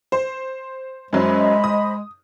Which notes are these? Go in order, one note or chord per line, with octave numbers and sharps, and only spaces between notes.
C5
F#2 F#3 G#3 C#4 C5 D#5 B5
D#6